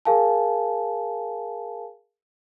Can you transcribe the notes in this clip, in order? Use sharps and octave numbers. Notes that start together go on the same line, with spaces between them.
G#4 A#4 F5 G#5 A5